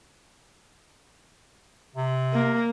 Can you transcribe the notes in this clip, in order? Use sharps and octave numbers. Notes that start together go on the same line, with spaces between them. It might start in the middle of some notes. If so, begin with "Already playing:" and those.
C3
A#3